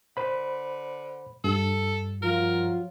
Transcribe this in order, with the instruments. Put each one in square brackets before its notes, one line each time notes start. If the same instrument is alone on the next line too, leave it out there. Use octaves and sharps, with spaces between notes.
[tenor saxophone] D3 [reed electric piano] C5 B5
[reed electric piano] G2 [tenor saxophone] A4
[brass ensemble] F3 F#3 F4 [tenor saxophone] A#4